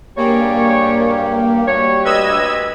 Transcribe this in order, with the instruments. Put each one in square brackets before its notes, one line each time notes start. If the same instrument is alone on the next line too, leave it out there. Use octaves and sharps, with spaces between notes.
[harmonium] G2 G4 [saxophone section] G3 G#3 C#5 [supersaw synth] A#3
[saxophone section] A3 F#4 C#5
[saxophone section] D2 B4 [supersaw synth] D#5 E6 G#6